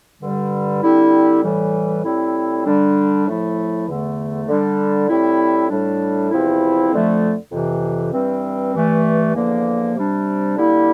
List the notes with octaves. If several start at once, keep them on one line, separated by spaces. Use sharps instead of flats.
G2 D3 G3
D3 G3 C4 E4
A2 E3 G3
A2 G3 C4 E4
D3 G3 D4
A2 F3 A3 E4
E2 D3 A3
D3 G3 D4
A2 G3 C4 E4
A2 G3 D4
E2 C3 F3 C4 E4
F2 D3 F3 A3
F2 C3 E3
G2 E3 G3 C4
G2 E3 A3
E2 D3 F3 A#3
C3 G3 D4
D3 G3 A#3 E4